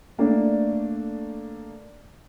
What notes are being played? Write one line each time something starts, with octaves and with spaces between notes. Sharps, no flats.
A3 A#3 D4 D5